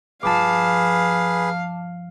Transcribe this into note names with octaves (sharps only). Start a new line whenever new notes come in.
G2 F3 G#4 B4 F5 A5 D6